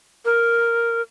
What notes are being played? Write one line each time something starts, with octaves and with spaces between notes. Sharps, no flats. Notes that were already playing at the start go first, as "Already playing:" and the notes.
A#4